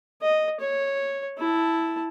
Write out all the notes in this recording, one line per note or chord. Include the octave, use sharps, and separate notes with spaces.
D#5
C#5
E4 A5